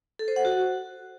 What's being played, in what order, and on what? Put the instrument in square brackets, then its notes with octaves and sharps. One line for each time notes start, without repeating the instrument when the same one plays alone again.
[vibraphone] A4
C5
F#5
F#4